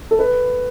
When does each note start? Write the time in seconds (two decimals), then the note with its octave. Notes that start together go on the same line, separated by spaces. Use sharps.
0.11 A4
0.19 B4